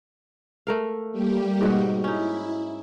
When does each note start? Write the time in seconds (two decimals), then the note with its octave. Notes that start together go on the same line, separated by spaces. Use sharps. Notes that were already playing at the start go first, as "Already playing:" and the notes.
0.67 A3 A#4 F5
1.12 G3 A#3 G4
1.61 G#2 B2 F#4
2.04 C#4 D#4 E4